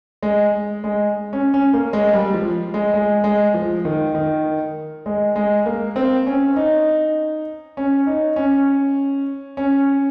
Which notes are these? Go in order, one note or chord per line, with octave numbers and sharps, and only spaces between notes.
G#3
G#3
C#4
C#4
A#3
G#3
G3
F3
G#3
G#3
G#3
F3
D#3
D#3
G#3
G#3
A#3
C4
C#4
D#4
C#4
D#4
C#4
C#4